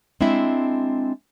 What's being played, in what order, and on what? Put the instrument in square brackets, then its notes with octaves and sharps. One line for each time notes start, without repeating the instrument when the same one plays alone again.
[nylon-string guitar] G#3 C4 D4 E4 E5